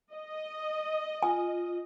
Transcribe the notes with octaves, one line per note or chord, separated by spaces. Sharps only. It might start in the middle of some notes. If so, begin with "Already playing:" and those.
D#5
F4 G#5